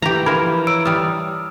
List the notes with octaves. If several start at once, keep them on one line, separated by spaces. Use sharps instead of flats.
E3 G4 A#5
F3 A#4 B5 G#6
C#5 A#5 E6 D7
G3 A5 D#6 F6